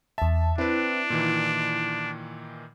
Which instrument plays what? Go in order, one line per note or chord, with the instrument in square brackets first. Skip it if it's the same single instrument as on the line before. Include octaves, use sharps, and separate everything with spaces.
[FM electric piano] E2 A5 [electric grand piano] E5
[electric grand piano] C4 B4 [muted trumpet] D4 [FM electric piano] E4
[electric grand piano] A#2 D#3 E3